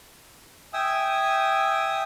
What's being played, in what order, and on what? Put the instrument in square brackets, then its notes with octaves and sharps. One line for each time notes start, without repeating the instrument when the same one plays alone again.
[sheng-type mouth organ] E5 G5 G#5 D#6 E6